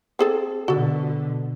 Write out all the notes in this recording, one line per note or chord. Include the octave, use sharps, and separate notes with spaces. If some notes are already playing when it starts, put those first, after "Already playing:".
C4 G#4 A4
B2 D3 F#4 A4